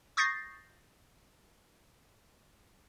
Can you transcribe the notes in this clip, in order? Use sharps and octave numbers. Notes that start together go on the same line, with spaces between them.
C#6 D#6 G6 A6 A#6 C7